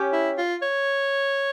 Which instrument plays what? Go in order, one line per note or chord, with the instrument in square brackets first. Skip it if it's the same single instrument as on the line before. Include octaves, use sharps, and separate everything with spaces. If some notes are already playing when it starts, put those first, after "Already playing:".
Already playing: [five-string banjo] C#4 G4 C#5
[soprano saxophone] E4
F4
C#5